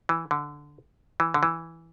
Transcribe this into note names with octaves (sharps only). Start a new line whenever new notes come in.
E3
D3
E3
D3
E3